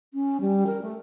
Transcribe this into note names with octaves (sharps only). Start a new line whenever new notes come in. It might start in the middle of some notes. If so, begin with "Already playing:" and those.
C#4
G3
A#4
A3